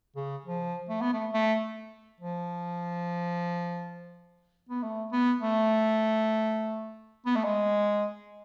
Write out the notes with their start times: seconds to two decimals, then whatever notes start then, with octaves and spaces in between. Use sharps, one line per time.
0.16 C#3
0.46 F3
0.89 A3
1.01 B3
1.13 A3
1.33 A3
2.21 F3
4.69 B3
4.83 A3
5.12 B3
5.41 A3
7.26 B3
7.36 A3
7.44 G#3